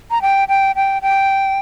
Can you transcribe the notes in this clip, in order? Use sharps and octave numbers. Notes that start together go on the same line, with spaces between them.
A#5
G5
G5
G5
G5